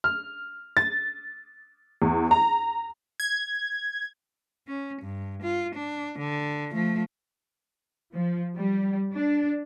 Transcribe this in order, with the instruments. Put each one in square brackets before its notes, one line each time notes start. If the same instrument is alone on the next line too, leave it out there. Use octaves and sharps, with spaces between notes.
[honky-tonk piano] F6
A6
E2
A#5
[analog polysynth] G#6
[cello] C#4
G2
F4
D4
D3
F3 A3
[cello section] F3
G3
D4